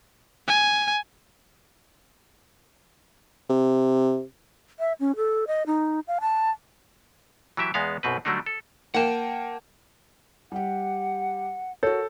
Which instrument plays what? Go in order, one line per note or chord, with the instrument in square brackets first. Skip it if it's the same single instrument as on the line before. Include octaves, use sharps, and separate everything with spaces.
[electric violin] G#5
[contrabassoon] C3
[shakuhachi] E5
C#4
A4
D#5
D#4
F5
A5
[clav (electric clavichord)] E3 F#3 G4 E5
E2 G#3 B3 F5
B1 F#2 B2 C4 B4
D3 F#3 G3 A3 D4 D#4
A4
[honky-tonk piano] A#3 G5 [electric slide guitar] F#5 A5
[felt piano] G3 G4 [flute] F#5
[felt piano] F#4 A#4 [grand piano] A4 [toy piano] C#5